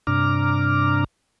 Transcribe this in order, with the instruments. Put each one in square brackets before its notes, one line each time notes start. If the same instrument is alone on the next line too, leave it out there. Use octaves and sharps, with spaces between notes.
[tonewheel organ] G2 C3 D4 A#5 D6 F6